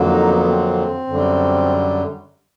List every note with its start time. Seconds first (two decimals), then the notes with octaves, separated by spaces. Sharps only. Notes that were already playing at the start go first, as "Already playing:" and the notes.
Already playing: F2 D3 F#3 A#3
0.08 D#4
0.27 B3
0.39 B3
0.48 C4
1.07 F#2 D3 G3